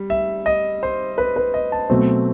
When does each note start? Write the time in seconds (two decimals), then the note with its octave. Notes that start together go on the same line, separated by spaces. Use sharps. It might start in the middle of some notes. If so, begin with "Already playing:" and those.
Already playing: G3
0.10 E5
0.46 D#5
0.83 C5
1.18 B4
1.36 B4
1.54 D#5
1.72 A5
1.90 B2 F#3 A3 C4